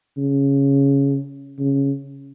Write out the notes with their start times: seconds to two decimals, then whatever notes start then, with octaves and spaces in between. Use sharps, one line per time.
0.18 C#3
1.59 C#3